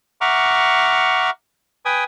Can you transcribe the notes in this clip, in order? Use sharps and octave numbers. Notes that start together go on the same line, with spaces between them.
E5 F#5 A#5 C#6 D6 F6
B4 G5 G#5 D#6